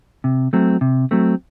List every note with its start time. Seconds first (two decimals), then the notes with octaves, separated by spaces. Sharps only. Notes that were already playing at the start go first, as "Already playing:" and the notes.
0.24 C3
0.53 F#3 A3 C4
0.81 C3
1.11 F#3 A3 C4